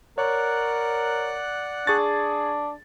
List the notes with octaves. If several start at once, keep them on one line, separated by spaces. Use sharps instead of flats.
A#4 C#5 D5 F#5 F#6
D4 G#4 C#6 A6